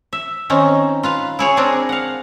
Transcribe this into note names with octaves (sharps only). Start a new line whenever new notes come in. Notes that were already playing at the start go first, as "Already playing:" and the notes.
E5
D#3 C4 C#4 D#4
F4 B4 F5
E4 G#4 C#5
C4 D4 G#4 A#4
F5 F#5